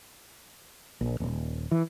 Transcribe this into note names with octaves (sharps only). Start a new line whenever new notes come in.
A#1
D#1
E3